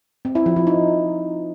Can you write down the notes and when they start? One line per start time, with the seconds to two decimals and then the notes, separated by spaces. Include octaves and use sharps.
0.25 C4
0.35 E4
0.46 F3
0.56 F3
0.67 D#4